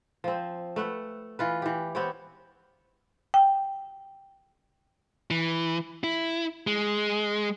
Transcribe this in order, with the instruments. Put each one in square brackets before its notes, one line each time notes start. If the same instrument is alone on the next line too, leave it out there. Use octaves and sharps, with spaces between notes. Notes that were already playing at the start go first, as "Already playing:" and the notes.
[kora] F3 C4
A3 B4 F#5
E3 F4 B4
E3 G4
B3 C4 G4 C#5
[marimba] G5
[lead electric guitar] E3
E4
G#3